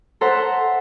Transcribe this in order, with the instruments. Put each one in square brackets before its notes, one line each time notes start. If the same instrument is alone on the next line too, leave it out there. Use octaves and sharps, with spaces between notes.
[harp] A4 C5 E5 F#5 A#5 C6